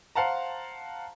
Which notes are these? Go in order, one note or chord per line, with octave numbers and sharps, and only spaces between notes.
C5 F5 F#5 A5 A#5